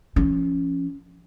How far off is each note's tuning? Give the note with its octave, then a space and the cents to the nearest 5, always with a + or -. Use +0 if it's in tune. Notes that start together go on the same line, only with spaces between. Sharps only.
F3 -30 C#4 +0